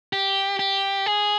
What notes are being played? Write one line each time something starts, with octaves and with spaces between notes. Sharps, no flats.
G4
G4
G#4